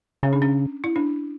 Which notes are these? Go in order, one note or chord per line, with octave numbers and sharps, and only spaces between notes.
C#3 C#4
D4
C#4
E4
D4